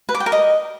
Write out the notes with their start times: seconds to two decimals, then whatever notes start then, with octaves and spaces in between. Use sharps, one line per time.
0.09 B4
0.15 D6
0.20 G5
0.26 A#4
0.32 D#5